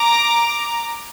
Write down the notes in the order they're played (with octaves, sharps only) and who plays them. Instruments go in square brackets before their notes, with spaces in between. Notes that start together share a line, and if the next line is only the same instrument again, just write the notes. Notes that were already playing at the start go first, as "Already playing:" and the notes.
Already playing: [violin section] A#5 D6